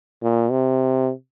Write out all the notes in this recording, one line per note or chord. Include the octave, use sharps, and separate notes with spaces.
A#2
C3